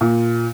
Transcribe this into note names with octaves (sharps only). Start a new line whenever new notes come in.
A#2